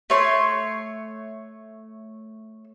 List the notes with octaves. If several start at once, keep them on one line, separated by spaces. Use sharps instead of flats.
A3 C#5 C6